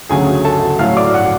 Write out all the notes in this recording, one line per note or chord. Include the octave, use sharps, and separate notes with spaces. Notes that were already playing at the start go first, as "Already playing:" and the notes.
D2 C#3 F#3 A3 G#4 G#5
A4 A5
A2 F#3 A3 F5 F6
D5 D6
F#5 F#6